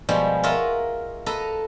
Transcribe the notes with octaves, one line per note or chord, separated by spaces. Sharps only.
B2 F3 G3 G#3
F4 A#4 C#5 D#5 E5 F#5
A4 B4 D#5 A#5